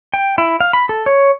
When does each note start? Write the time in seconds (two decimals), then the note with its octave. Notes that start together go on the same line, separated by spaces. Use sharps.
0.14 G5
0.38 E4
0.60 F5
0.73 B5
0.89 A4
1.06 C#5